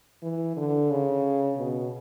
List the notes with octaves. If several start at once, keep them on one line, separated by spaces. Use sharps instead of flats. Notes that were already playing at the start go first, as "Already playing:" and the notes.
E3
D3
C#3
B2